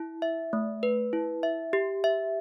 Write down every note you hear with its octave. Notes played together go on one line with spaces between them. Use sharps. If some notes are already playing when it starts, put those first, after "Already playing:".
Already playing: E4
E5
A3
B4
E4
E5
G4
E5